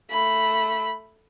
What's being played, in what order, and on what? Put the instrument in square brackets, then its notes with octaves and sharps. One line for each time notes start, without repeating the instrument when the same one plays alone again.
[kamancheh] A3 B5